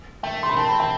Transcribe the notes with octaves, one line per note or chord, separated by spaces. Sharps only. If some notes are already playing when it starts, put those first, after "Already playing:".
A3 G5
C6
B5
C4 A5
B5
G5